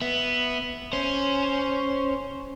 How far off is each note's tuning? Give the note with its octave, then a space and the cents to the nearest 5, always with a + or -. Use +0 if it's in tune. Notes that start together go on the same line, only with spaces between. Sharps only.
B3 +0 E5 +0
C#4 +0 C5 +0